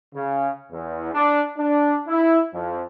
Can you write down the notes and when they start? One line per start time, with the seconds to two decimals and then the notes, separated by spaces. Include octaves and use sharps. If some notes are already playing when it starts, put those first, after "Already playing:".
0.15 C#3
0.72 E2
1.13 D4
1.58 D4
2.07 E4
2.54 F2